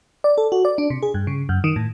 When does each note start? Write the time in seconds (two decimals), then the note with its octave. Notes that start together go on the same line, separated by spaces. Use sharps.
0.24 D5
0.38 A4
0.52 F#4
0.65 D5
0.78 D4
0.90 C3
1.02 G#4
1.14 G2
1.27 C#3
1.49 F#2
1.64 D#3
1.76 A2